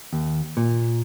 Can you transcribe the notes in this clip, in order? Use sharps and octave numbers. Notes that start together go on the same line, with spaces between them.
D#2
A#2